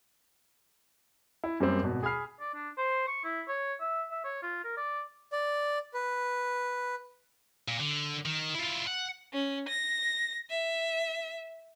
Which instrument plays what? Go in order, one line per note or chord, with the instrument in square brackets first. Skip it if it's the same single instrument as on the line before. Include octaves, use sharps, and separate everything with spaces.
[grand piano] E4
F#2 G3 A#3 C4
G#1 B2
G#4 G#5 B5 F6 C7
[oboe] D5
D4
C5
C#6
E4
C#5
E5
E5
C#5
F4
A#4
D5
[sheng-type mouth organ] D5
B4
[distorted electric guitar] A#2
D3
D#3
E4 F4
F#5
[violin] C#4
A#6
E5